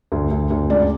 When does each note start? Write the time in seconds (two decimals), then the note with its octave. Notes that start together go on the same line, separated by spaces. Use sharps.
0.12 D2
0.31 D2
0.50 D2
0.70 C#2 D5